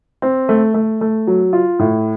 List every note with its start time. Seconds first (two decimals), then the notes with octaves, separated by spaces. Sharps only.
0.22 C4
0.49 A3
0.74 A3
1.01 A3
1.27 F#3
1.53 F4
1.79 A2